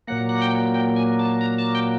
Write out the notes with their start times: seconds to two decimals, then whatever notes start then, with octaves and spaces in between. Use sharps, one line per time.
0.08 A#2 F#3 A#3 F#5
0.29 F#5
0.42 G5
0.74 G5
0.96 G#5
1.19 A5
1.41 A#5
1.58 A5
1.75 G5